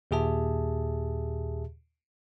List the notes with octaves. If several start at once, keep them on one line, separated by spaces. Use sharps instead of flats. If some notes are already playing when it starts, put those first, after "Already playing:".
D#2 A#2 G4 G#4 E5 A5